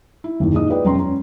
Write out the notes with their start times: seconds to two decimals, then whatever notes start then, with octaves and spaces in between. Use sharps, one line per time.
0.24 E4
0.40 F#1 D#2
0.53 A#2 G#3 D#4 D#6
0.69 F4 G#4 B4 D5 G5
0.84 E1 F#2 C#4 G5 A#5 C6
0.99 C#4